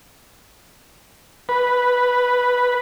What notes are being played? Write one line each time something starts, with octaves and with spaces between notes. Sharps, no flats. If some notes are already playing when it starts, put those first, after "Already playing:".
B4